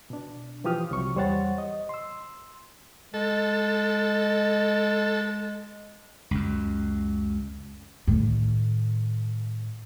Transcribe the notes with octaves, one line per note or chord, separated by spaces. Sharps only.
B2 D4
E3 F3 F4 G4 D#6 F6
C2 C3 F#3 C#6
E2 G3 C5 C#5 F#5 A6
D#5
C6 E6
G#3 A4
C#2 F#2
A2 D#3